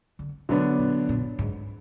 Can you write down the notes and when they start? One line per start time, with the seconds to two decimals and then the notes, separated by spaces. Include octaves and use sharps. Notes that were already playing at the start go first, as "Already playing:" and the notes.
0.19 D3
0.49 B2 D3 F#3 B3 D4
0.79 A#2
1.09 A#2
1.39 G#2